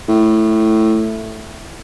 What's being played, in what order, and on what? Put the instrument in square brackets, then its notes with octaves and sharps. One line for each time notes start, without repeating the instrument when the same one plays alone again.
[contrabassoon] A2